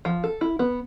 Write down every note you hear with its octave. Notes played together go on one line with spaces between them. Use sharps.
F3
A4
E4
B3